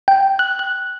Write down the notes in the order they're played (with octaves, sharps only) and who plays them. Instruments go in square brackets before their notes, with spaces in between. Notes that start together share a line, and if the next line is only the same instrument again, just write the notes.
[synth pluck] G5
F#6
F#6